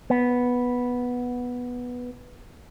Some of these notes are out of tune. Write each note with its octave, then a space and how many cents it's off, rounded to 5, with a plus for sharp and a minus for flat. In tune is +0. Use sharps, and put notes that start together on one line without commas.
B3 -5